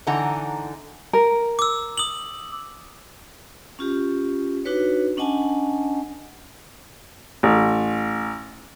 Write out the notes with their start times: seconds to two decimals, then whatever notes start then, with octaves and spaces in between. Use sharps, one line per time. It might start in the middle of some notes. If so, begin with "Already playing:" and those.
0.07 D3 E3 D#4 F#5 A#5
1.13 A#4
1.59 D6 E6
1.98 D#6 F#7
3.79 C#4 F4 G4
4.65 D4 D#4 F#4 B4 C#5
5.17 C#4 D4 D#5 F#5 G#5 A5
7.43 A1